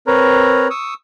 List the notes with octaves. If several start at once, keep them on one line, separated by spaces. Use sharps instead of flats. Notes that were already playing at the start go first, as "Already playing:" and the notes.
C4 A#4 B4 C#5 A#5
C#6 D#6 E6